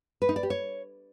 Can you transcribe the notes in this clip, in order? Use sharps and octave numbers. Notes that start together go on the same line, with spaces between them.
B4
D#4
D5
G4
C#5